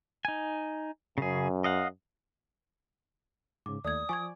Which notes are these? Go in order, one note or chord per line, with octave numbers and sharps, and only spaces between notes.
D#4 G#5
F#2 C#3 G#4
D#5 F5 F#5
G#2 C#3 D6
D#2 A3 D5 D#6 G#6
F3 D5 G#5 C#6 D6 G#6